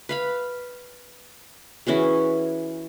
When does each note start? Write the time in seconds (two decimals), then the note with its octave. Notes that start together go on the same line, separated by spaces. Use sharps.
0.09 B4 F5 B5
1.87 E3 C#4 F#4 G#4